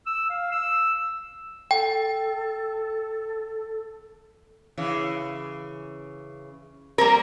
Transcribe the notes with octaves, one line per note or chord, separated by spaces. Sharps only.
E6
F5
E6
A4 G5
C#3 E3
G3 A#3 C4 A#4 A#5